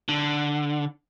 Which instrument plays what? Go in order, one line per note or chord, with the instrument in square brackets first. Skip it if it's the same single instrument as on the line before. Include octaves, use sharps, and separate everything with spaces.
[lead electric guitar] D3